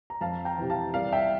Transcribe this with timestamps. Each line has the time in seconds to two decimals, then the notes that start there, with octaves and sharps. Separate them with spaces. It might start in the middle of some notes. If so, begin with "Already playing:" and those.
0.10 A#5
0.21 F2 F5 A5
0.45 G5 A#5
0.58 C3 E3
0.70 F5 A5
0.94 C2 D5 F5
1.12 E5 G5